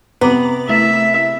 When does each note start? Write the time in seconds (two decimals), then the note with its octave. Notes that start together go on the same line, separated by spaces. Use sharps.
0.21 C3 B3 A#5 D6 F#7
0.69 A3 E4 E5